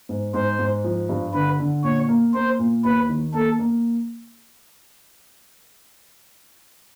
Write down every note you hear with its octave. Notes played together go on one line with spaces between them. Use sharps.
G#2
G#2 C5
G#2
F3
G2
D3 B4
D3
A#2 C#5
A#3
A#3 C5
A#2
D#2 B4
D#3
A#3 A4
A#3